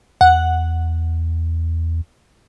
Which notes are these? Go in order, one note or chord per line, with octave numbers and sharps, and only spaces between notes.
E2 F#5